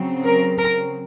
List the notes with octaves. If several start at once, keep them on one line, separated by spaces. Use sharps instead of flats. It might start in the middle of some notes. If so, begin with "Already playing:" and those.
Already playing: C#3 F#3 C4
A#4
A#4